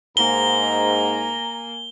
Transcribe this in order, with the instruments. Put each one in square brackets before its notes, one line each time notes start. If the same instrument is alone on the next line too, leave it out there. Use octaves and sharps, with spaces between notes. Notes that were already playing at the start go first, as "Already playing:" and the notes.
[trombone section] G#2 [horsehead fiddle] A#3 G#5 [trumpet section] A#5 [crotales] G7